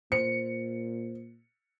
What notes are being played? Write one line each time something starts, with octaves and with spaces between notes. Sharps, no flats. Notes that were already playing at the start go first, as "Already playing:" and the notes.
A#2 C5 C#7